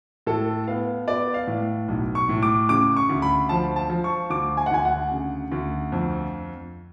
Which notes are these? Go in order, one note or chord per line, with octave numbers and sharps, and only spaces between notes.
A2 A4
B3 F5
B3 D5
F5
A2
B1
C#6
A2
D6
C#3 D6
C#6
D2
B5
F3 A5
A5
F3
C#6
D2 D6
G#5
F#5
D2 G#5
F#5
C#3
D2
F2